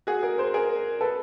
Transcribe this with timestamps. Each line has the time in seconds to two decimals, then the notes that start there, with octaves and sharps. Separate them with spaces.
0.07 F#4 G#4
0.23 G#4 A#4
0.38 A#4 C5
0.54 G#4 A#4
1.01 A4 B4